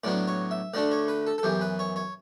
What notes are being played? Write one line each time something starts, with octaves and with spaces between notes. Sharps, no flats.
A2 F#3 B3 D4 D5
C#5
E5
D2 D3 A3 D4 D5
C#5
B4
A4
A4
F#2 E3 B3 G4
B4
C#5
C#5